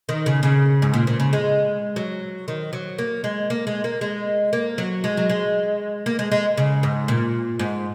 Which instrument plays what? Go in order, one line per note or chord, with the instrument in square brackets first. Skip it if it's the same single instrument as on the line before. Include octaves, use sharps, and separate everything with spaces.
[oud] D#3
C#3
C#3
G#2
A#2
A#2
C#3
G#3
F#3
D#3
F#3
A#3
G#3
A#3
G#3
A#3
G#3
A#3
F#3
G#3
F#3
G#3
A#3
G#3
G#3
C#3
G#2
A#2
G#2